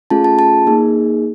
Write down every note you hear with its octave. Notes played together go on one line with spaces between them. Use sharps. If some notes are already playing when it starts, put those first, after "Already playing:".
A3 C#4 F4 G#4 A5
A5
A5
A#3 D#4 G#4